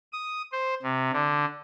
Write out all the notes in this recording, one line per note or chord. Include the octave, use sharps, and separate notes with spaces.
D#6
C5
C3
D3